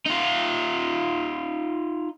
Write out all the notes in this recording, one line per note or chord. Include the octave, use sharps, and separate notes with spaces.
D#4 F4